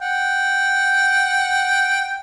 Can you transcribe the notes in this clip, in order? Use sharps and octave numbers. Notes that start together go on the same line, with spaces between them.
F#5 G5